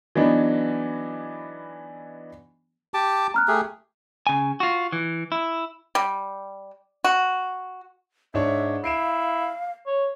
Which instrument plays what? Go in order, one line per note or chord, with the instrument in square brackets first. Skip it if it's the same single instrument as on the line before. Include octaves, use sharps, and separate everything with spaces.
[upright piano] E3 F#3 B3 D4 D#4
[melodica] G4 A5 D6
[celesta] A#5 F6 F#6
[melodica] A3 G4 G#4
[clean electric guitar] C#3 G#5
F4 F#4
E3
E4
[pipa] G3
F#4
[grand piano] G#2 D4 C#5 [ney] E5
[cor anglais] E4 [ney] F5 [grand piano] C7 D7 E7
[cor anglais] C#5